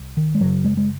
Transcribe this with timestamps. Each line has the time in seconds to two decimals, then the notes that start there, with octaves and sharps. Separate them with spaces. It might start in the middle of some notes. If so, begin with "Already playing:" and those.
Already playing: C2
0.17 D#3
0.35 G#3
0.40 F#1 F#2 C#3 F#3
0.64 G#3
0.77 G#3